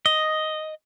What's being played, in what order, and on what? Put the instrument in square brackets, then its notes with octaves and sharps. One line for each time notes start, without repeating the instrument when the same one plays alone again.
[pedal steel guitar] D#5